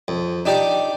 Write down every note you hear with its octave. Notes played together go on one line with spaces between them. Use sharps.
F2
D4 D#4 G4 D5